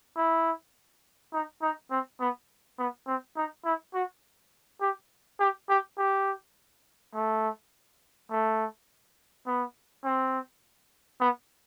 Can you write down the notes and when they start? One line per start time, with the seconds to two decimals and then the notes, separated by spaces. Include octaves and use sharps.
0.16 E4
1.33 D#4
1.62 D#4
1.91 C4
2.20 B3
2.78 B3
3.07 C4
3.36 D#4
3.65 E4
3.94 F#4
4.81 G4
5.40 G4
5.69 G4
5.98 G4
7.14 A3
8.31 A3
9.46 B3
10.04 C4
11.20 B3